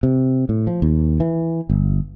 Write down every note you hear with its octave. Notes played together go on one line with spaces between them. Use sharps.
C3
A2
F3
D#2
E3
G1